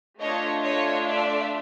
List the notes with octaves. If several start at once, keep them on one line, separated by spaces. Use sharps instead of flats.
A3 D4 F4 C#5 D#5
C#5 D#5
D5 E5